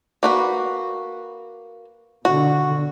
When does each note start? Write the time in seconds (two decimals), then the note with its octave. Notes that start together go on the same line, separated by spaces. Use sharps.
0.23 A#3 F#4 B4
2.25 B2 D3 F#4